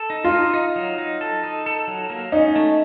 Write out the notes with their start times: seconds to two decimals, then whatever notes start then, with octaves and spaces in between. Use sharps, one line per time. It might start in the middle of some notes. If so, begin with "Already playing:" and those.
Already playing: A4
0.10 D#4
0.24 F4
0.31 D#4
0.54 D#4
0.76 F#3
0.98 D#4
1.21 A4
1.44 D#4
1.66 A4
1.88 F#3
2.10 A#3
2.32 C#4 D#4
2.56 A3